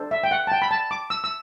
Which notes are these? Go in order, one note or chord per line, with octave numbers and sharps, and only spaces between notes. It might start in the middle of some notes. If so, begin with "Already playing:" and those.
Already playing: D4 A4 C5
E5
G5
F#5
A5
G5
B5
A5
D6
E6
E6